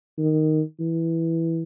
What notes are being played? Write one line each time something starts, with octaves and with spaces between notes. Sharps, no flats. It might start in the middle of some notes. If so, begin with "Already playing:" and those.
D#3
E3